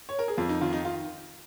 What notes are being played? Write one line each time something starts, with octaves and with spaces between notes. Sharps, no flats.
C#5
A#4
G#4
F2 F4
D#4
D#3 F4
D#4
F4